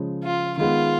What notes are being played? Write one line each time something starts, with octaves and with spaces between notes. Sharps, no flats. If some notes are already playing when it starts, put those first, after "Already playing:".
Already playing: C#3 F3 G#3
F4
D#3 G#3 B3 F4